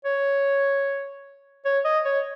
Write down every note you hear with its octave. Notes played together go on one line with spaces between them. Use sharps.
C#5
C#5
D#5
C#5